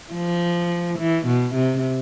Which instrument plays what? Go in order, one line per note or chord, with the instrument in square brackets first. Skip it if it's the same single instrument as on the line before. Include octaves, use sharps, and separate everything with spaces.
[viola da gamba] F3
E3
B2
C3